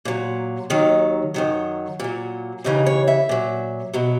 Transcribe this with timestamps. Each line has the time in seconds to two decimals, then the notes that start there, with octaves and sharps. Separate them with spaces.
0.05 A#2 F#3
0.70 D#2 D#3 F#3
1.34 F#2 D#3 F#3
2.00 A#2 F#3
2.64 D#2 C#3 E3 D#4
2.86 C#5
3.08 E5
3.29 A#2 F#3
3.93 B2 F#3